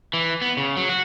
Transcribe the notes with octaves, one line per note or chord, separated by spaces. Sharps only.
E3
B3
C#3
F#3
F#4